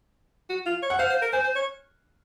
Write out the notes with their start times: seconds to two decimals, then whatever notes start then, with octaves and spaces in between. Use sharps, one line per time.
0.50 F#4
0.66 F4
0.83 C#5
0.90 F#5
0.99 C5 F5
1.10 C5
1.22 A#4
1.32 C5 G#5
1.44 C5
1.55 C#5